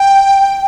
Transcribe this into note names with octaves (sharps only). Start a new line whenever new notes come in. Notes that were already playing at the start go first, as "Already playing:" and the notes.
Already playing: G5